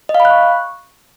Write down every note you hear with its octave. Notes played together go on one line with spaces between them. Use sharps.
D#5
F5
B5
F#6
C#6